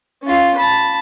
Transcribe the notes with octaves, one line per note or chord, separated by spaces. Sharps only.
C#4 F4
A5 B5